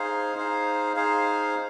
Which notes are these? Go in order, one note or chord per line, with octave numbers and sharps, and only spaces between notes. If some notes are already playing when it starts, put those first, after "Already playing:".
Already playing: D#4 G#4 C5 F5
D#4 G#4 C5 F5
D#4 G#4 C5 F5